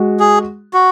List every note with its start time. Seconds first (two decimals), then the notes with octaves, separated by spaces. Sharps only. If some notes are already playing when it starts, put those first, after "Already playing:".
Already playing: G#3 F#4
0.20 G#4
0.74 F#4